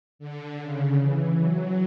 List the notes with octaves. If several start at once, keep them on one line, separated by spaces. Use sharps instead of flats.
D3
C#3
E3
F#3